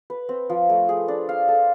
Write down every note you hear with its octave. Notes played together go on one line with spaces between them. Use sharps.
B4
C4
F3
A3
G#4
D4
F5
A4